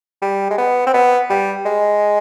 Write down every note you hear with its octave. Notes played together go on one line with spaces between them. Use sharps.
G3
G#3
B3
C4
B3
G3
G#3